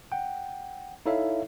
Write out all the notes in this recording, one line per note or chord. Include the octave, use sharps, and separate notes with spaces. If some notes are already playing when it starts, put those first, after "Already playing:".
F#5 G5
D#4 E4 A4 C#5 E5 F5